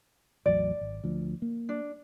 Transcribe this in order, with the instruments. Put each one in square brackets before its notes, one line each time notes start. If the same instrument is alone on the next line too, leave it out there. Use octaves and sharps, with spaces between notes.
[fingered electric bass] A1 E2 F#3 [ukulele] D5
[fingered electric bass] G#1
D2 F3
A#3
[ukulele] D4